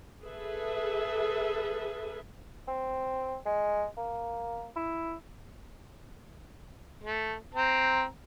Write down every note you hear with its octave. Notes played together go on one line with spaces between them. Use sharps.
G#4 A4 B4 E5
C4
G#3
A#3
E4
A3
C4 A#5